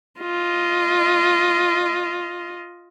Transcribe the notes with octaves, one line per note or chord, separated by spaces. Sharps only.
F4 D#5